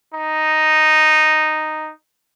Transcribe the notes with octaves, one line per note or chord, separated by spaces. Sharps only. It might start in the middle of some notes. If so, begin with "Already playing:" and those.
D#4